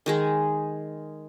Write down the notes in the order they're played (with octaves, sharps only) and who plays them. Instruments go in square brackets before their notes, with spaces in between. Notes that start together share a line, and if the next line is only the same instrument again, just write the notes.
[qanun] D#3 G#3 G#4